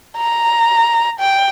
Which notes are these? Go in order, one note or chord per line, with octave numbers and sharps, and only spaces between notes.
A#5
G5